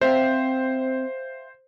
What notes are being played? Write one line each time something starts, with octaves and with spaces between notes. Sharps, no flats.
C4 C5 E5 F5 G5